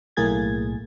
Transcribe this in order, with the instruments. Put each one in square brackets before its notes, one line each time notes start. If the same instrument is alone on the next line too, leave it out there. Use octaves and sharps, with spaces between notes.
[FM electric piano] B1 A2 A#3 G#4 G#6 A6